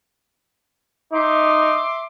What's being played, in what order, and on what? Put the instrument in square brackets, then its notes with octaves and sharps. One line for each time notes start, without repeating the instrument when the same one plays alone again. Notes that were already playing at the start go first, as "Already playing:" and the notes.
[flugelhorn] D#4 [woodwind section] E5 C6 D6